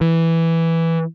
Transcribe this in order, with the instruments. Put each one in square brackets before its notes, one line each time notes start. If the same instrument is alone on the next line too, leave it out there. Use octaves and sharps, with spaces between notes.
[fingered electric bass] E3